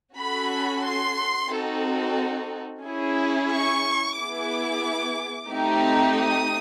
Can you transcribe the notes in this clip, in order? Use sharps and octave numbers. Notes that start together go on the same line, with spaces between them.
C#4 F#4 A4 B5
C6
C4 D#4 F#4 A4
C#4 E4 G#4
C#6
B3 E4 G#4 D6
A3 C4 D#4 G4
D#6